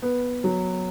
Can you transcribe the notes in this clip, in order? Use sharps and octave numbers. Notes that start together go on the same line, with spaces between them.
B3
F#3